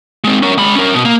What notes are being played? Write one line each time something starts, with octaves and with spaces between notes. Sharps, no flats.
G#3 C4
C#4 A#4
G#3 B5
C#4 A#4
B2
A#3